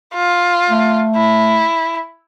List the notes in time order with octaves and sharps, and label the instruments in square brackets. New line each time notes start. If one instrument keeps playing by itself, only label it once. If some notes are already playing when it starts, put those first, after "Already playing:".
[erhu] F4
[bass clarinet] A3
[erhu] E4